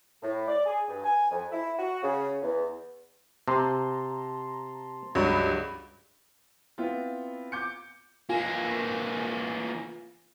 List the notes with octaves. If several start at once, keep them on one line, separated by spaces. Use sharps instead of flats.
A2
D5
G#4
G2
G#5
F2
E4
F#4
C#3
E2
C3 A5 A#5 C6
C#2 G2 F#3
B3 C4 E4 F4
D6 G6 C#7
E3 A#3 F4 G#5